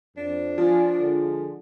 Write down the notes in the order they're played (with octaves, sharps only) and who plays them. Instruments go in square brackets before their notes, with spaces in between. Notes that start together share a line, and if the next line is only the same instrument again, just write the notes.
[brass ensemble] F2 [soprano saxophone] D4
[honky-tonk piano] F3 [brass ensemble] F4 G#5
[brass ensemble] D3 G#3